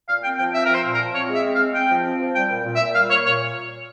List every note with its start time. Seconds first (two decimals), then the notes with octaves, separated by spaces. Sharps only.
0.08 A#2 F5
0.23 C4 G5
0.38 F3 G5
0.54 C4 E5
0.65 F3 A#4
0.74 C5
0.84 A#2
0.94 A#4
0.99 F3
1.14 C4 C#5
1.29 G#3
1.35 E5
1.44 C4
1.55 F5
1.60 G#3
1.74 C4 G5
1.89 F3
2.05 C4
2.20 F3
2.35 G3 G5
2.50 A#2
2.64 A#2
2.76 E5
2.80 A#2
2.95 G3 F5
3.10 A#3 C#5
3.26 A#2 C#5